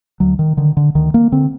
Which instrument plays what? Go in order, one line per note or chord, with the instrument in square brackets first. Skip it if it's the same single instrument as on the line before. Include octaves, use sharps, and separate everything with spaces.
[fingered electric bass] D2 F#3
D#3
D3 D#3
D3
D2 D#3
A#3
D3 C4